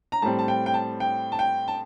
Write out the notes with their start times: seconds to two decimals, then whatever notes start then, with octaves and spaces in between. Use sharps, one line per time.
0.12 A#5
0.22 A2 G3 C4 A5
0.39 A5
0.48 G5
0.66 G5
0.74 A5
1.00 G5
1.32 A5
1.39 G5
1.68 A5